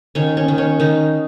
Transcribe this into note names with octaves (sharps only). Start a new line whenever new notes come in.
D#3 C#4
C#4
D#3
C#4
D#3 D#4